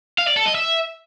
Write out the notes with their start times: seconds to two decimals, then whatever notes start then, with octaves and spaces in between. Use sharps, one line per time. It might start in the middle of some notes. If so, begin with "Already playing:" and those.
0.18 F5
0.28 D5
0.37 A4
0.46 D#5
0.55 E5